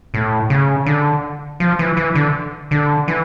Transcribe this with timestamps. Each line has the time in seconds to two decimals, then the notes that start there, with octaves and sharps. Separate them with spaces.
0.14 A2
0.50 C#3
0.86 D3
1.60 F3
1.79 E3
1.97 E3
2.15 D3
2.71 D3
3.08 E3